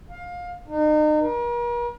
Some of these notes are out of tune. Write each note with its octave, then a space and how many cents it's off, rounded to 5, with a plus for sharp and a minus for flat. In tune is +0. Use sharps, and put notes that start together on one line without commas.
F5 +20
D#4 -35
A#4 +45